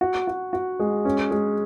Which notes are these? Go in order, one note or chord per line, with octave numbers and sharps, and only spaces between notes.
F#4
F#4
F#4
G#3
C#4
G#3